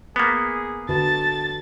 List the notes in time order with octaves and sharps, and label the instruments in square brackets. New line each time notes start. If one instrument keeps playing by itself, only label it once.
[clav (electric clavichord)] A#3 B3 [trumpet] G#4
[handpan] D3 F#4 B4 [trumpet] A5 [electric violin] A6